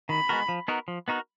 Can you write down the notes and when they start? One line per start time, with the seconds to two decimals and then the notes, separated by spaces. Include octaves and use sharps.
0.09 D#3 B5
0.29 G#3 B3 F#4 A#4
0.49 F3
0.68 B3 D#4 F#4 A#4
0.88 F3
1.08 B3 D#4 F#4 A#4